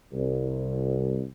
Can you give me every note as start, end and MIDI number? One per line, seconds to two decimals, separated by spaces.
0.13 1.23 36